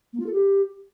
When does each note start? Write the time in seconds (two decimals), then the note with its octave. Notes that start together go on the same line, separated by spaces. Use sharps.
0.13 A#3
0.20 F4
0.26 A4
0.33 G4